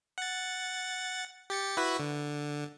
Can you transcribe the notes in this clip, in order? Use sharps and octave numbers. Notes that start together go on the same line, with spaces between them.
F#5 A6
G4 A6 C#7
E4 F#4 B4
D3